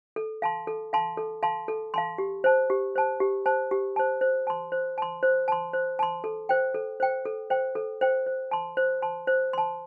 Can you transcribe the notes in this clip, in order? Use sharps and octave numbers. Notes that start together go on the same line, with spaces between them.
A4
F5 A5 C6
A4
F5 A5 C6
A4
F5 A5 C6
A4
F5 A5 C6
G4
C5 A5
G4
C5 A5
G4
C5 A5
G4
C5 A5
C5
A5 C6
C5
A5 C6
C5
A5 C6
C5
A5 C6
A4
C5 G5
A4
C5 G5
A4
C5 G5
A4
C5 G5
C5
A5 C6
C5
A5 C6
C5
A5 C6